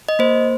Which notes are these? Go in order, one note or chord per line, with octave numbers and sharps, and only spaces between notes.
D#5
A#3 C5